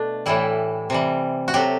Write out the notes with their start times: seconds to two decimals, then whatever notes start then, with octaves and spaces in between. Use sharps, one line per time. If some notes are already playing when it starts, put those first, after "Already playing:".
Already playing: B2 A3 D4
0.26 A2 E3 G3 E4
0.90 C3 E3 G3
1.48 F#4
1.54 C3 F#3 A3 G4